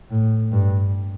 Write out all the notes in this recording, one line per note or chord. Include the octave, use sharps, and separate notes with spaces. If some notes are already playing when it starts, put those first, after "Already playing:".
A2
G2